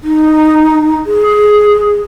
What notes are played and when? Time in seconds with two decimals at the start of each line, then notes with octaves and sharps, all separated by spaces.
0.03 D#4
1.06 G#4